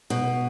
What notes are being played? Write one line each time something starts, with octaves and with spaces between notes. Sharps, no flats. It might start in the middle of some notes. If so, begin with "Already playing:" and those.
B2